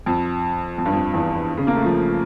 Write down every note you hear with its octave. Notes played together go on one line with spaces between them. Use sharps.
F2
F2
G2
F2
E2
C#3
A#3
A3
F3